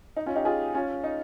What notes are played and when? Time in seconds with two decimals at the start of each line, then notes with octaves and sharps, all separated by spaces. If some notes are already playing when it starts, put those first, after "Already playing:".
0.16 D#4
0.26 C#4 F4
0.36 D#4 G4
0.45 F4 G#4
0.75 C#4 F4
1.04 D#4